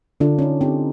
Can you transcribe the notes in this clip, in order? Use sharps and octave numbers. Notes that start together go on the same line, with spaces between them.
D3 D4 F4
C#4 D#4
C4 D#4 G4